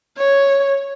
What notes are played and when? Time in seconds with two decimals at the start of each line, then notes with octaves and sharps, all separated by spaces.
0.17 C#5